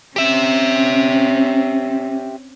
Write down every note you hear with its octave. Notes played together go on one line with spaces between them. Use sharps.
C4 C#4 G4 E5